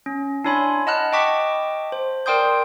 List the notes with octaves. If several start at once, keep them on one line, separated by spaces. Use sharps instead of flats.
C#4
D4 E4 C#5 G#5 B5 C6
D#5 F#5 A5 B5 F6 F#6
D#5 G5 A5 C#6 D6 B6
C5
A#4 D5 G5 C6 D#6 G6